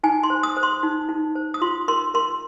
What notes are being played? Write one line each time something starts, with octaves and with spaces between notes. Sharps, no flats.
D#4 G#5
C6
C5
D#6
C5
C6
D#4
D#4
C5
D#6
F4 C6
A#4 C6
A#4 C6